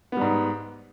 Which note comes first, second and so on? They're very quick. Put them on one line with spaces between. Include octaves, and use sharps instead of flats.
B3 G3 G#2